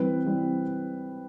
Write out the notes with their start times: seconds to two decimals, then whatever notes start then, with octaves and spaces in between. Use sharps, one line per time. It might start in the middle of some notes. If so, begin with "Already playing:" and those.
Already playing: E3 G3 C4 B4
0.25 E3 G3 C4